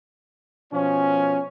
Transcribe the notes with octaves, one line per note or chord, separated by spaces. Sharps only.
B2 F3 C#4